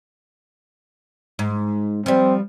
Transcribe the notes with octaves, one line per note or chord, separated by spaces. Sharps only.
G#2
F3 G3 C4